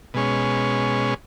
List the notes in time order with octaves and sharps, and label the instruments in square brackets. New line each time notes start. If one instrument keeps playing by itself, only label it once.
[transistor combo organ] B2 G#3 C#4